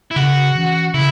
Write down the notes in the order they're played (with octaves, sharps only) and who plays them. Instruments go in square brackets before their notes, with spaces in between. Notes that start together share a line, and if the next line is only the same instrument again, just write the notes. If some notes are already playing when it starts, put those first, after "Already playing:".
[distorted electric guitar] E4
[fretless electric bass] C#3 [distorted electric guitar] F#4
[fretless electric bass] E3 C#4
[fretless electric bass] C#3 [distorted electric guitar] E4